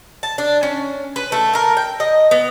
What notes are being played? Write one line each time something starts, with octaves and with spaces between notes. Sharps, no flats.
A5
D4
C#4
B4
A3
A#4
G5
D#5
B3